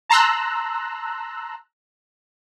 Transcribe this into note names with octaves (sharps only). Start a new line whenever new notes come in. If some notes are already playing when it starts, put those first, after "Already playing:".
A5 A#5 C6 E6 F#6